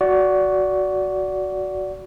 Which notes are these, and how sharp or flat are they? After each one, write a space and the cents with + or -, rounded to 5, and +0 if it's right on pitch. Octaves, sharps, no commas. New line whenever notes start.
F#4 +0 D5 -20